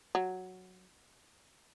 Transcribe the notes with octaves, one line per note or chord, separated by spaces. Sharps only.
F#3